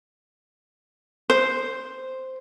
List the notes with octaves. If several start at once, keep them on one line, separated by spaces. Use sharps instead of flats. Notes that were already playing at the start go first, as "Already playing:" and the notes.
C5